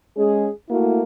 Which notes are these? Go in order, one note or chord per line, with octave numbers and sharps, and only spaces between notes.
G#3 C#4 G#4
A3 A#3 E4 F#4